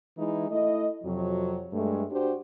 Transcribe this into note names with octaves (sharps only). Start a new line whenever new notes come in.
E3 G#3 D#4 E4
A3 E4 D#5
F2 C3 F#3
G2 G#3 A3
D4 F#4 G4 C5